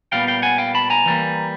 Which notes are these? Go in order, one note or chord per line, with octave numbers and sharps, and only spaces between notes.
A#2 G3 B3 F5 G5
F5 G5
F#5 G#5
F5 G5
A5 B5
G#5 A#5
E3 G3 A#3